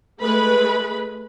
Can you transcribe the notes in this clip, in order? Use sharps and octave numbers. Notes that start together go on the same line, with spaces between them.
G#3 A3 B4 B5